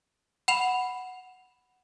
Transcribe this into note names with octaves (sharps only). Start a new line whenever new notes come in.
F#5 B5 E7 F7